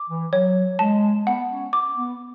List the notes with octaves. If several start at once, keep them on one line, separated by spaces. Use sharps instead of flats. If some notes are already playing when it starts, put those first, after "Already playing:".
Already playing: D6
E3
F#3 C#5
G#3 A5
B3 F#5
C#4
D6
B3